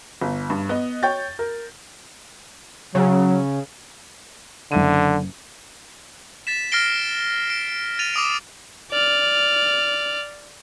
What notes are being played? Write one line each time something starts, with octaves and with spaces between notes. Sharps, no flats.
G1
G2
B3 D#5
C#5 G5 C#6 G6 A6
A#4
C#3 F#3
F#1 D3 E5 D#7
A6 B6 E7
F6 A6 A#6 C7 D7 G7
D7
A6 D#7 F7
D6 D#6 D7
D5 F6